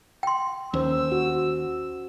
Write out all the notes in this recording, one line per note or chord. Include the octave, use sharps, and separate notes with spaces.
G5 C6
D#2 C#4 C5 E6
F#4